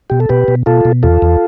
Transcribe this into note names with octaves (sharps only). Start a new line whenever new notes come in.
B2 G4
A4
B2 G4 B4
B2
B2 F4 A4
B2
E2 F4 A4
E2